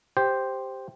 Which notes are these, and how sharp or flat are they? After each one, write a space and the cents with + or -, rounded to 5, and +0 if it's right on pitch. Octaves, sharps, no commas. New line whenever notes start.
G4 +0 C5 +0